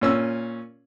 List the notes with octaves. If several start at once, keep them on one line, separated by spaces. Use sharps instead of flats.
A#2 C#4 E6